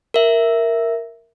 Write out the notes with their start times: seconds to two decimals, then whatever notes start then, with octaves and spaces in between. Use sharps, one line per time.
0.14 A#4 E5